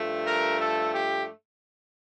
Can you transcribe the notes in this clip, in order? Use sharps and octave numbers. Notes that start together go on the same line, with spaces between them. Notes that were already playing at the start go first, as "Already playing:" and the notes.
Already playing: G2 F3 A3
A#4
A4
G4